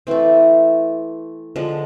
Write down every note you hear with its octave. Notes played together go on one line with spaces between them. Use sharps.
E3 A3 C4
D3 F3 G#3